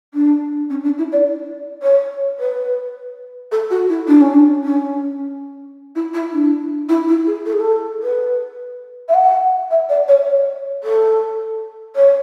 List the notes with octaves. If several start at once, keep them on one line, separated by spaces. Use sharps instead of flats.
D4
C#4
D4
E4
D5
C#5
B4
A4
F#4
E4
D4
C#4
D4
C#4
E4
E4
D4
E4
E4
G#4
A4
G#4
A4
B4
E5
F#5
E5
D5
C#5
C#5
A4
C#5